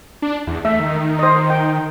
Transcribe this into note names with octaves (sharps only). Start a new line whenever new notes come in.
D4
E2
A3 E5
D#3
C5 D#5
G5